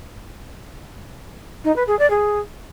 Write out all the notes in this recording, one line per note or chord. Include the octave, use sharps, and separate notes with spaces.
D#4
B4
G#4
D5
G#4